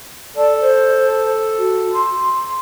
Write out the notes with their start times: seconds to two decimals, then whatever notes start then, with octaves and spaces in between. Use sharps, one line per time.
0.36 A4 D5
0.61 C5
1.58 F#4
1.93 C6